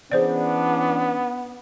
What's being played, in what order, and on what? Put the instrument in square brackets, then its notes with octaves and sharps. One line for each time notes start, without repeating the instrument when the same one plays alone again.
[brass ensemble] E3 C#4 D4 [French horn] B3 [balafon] G#4 C5 D5